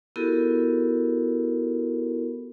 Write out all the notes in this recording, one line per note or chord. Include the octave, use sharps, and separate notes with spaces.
B3 E4 F#4 G4 A4 A#4